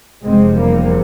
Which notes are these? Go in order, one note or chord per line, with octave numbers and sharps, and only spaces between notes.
F1 E2 C3 G#3 C4
G3 A#3